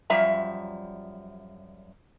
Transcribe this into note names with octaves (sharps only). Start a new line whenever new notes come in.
F#2 F3 G3 E5 A#5